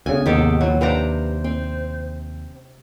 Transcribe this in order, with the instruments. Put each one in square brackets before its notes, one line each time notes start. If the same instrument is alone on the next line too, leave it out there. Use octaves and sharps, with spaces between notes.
[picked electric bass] D2 C#3 [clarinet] B3 [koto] G#5
[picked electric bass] D#2 [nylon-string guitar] G#2 C3 G#3 [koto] D#3 G4 A4
[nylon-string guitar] B2 F3 [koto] F#3
[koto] C3 D4 A#5 [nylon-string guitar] G4 B4 F5 [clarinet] C5
[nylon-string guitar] C4